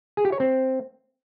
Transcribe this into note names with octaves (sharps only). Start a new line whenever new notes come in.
G#4
G4
C#5
C4